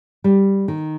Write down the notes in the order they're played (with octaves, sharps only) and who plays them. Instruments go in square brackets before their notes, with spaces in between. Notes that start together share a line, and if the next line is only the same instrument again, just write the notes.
[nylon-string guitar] G3
D#3